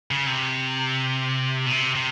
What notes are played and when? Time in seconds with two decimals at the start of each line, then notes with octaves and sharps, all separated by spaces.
0.11 C#3
0.26 C3
1.66 B2
1.72 C3
1.95 C3